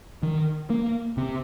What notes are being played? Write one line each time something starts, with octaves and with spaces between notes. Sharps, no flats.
D#3
A#3
C3